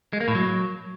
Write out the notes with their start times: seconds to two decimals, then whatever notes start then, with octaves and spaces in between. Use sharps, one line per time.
0.13 G#3
0.20 A#3
0.28 A2
0.35 F#3